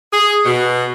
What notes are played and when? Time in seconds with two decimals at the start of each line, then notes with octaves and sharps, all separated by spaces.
0.11 G#4
0.45 B2